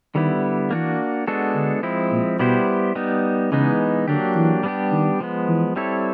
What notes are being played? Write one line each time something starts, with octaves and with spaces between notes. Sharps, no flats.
D3 D#3 G3 B3 E4
E3 A#3 D4 F#4
G#3 B3 D4 F#4 A4
D3
F3 G#3 C4 E4
A#2
B2 G3 B3 E4 G4 C5
G3 B3 D#4
C#3 E3 G#3 B3 D#4
D3 F#3 A#3 D4 G4
E3
G3 B3 D4 G4
D#3
F3 G#3 B3
E3
G3 C4 E4 A4 C#5